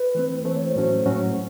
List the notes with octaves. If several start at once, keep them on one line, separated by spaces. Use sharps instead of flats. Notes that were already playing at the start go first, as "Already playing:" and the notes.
Already playing: B4
E3 A3 C4
E3 A3 C4 C5
C#5
C5
A2 F#3 A3 C#4 F#4
A2 F#3 A3 C#4 F#4